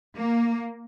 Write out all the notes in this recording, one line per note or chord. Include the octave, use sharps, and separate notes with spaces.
A#3